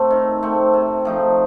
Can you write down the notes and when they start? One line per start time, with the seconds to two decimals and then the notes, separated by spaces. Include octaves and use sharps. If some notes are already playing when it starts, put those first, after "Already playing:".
Already playing: A3 C4
0.10 D#3
0.43 A3 C4
0.73 C3
1.05 F3 A3 D#4